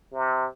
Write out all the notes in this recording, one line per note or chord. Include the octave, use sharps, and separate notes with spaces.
C3